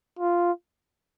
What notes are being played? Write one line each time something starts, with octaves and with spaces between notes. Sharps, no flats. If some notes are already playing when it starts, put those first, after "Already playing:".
F4